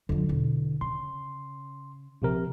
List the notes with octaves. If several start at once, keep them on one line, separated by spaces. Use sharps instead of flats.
F2 D3 F#3
E2 B2
C#3 C6
A#1 C3 A#4